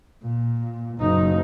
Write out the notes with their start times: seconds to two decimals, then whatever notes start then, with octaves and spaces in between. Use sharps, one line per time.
0.22 A#2
0.99 F#1 D#4